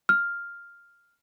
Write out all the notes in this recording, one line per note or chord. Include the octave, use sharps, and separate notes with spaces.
F6